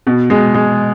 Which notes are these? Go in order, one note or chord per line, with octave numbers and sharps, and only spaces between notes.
B2
G#3
G#3